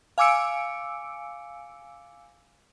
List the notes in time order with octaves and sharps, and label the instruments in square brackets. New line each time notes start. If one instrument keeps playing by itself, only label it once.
[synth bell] F5 G#5 D6 E6 C#7 D7